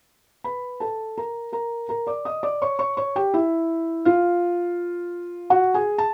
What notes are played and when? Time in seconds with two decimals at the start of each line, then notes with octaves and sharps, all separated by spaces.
0.44 B4 B5
0.80 A4 A5
1.18 A#4 A#5
1.53 A#4 A#5
1.89 A#4 A#5
2.07 D5 D6
2.25 D#5 D#6
2.43 D5 D6
2.62 C#5 C#6
2.79 C#5 C#6
2.97 C#5 C#6
3.16 G4 G5
3.34 E4 E5
4.05 F4 F5
5.50 F#4 F#5
5.74 G#4 G#5
5.98 A5